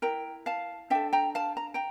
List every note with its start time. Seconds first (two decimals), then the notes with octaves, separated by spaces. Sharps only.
0.02 E4 A#4 G5 A#5
0.46 F5 A5
0.90 D4 A4 E5 G5
1.13 G5 A#5
1.35 F5 A5
1.57 A#5
1.74 G5 A#5